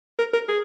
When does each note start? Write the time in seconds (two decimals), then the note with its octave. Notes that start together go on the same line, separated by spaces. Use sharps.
0.19 A#4
0.33 A#4
0.48 G#4